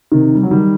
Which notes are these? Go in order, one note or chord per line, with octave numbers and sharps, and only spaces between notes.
C3 D#3
G3
F#3
D#3 G3